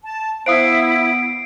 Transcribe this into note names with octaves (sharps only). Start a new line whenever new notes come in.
A5
B3 E4 C5 F5 D#6 C7 D7